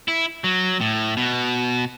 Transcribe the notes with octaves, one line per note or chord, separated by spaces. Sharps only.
E4
F#3
A2
B2